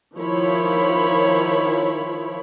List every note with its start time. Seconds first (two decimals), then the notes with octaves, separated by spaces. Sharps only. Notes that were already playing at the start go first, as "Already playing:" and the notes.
0.16 D#3 F3 E4 C#5 B5